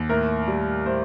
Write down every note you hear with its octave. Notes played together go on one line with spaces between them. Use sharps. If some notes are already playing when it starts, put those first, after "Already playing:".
Already playing: D#2
A2 A#4
G3
A2 C5